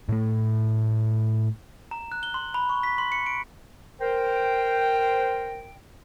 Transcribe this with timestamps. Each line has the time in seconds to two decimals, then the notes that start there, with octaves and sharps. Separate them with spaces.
0.09 A2 A3
1.91 A#5
2.12 F#6
2.23 G7
2.34 C6
2.54 B5
2.69 C#6
2.83 B6
2.98 C6
3.12 C#7
3.26 D7
4.01 A#4 C5 G5